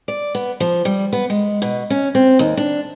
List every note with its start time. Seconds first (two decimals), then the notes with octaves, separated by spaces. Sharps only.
0.08 D5
0.35 B3
0.60 F3
0.85 G3
1.13 B3
1.30 G#3
1.62 B2
1.90 C#4
2.15 C4
2.39 D#2
2.57 D4